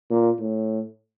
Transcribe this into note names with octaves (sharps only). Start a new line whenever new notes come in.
A#2
A2